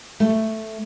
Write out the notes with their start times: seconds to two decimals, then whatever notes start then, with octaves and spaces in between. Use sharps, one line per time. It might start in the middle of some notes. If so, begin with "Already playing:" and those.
0.20 A3